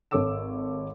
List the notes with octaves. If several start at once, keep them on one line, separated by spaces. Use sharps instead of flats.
G#1 A4 C#5 D6 E6 E7